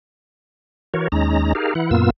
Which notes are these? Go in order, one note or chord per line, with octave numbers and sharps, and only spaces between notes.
E3 F#4 A#4 C#5
D#2 G#3 C#4 D#4 A#5
D#4 G4 G#4 A#4 F5
E3 E4 F#5
F#2 A#2 A#3 B3 F4 E6